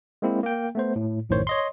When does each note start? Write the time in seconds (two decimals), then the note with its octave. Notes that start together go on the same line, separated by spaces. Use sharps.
0.22 G#3 A#3 C4 E4
0.43 A#3 G5
0.75 A3 B3 C5
0.96 A2
1.29 A#1 F#2 A2 D#3 C5 C#5
1.47 C#5 D#5 C6